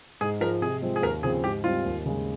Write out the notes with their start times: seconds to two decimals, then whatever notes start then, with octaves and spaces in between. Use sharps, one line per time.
0.21 G#2 G#4
0.41 F3 G#3 A#4
0.61 C3 G#4
0.82 F3 G#3 C4
0.96 G#4
1.02 D#2 A#4
1.23 C#3 F3 C4 G#4
1.44 G#2 G4
1.64 G3 C4 F4 G4
1.85 D#2
2.06 C#3 G#3